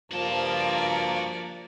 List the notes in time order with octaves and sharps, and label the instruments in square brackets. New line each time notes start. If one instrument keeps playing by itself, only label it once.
[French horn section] G2 F3 [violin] A#3 D5 [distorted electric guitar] F#4 A5